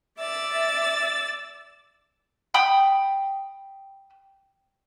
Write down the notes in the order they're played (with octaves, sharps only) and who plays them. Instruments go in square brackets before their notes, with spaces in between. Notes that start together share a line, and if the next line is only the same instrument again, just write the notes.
[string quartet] D5 E6 A6 [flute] E5
[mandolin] G5 B5 D#6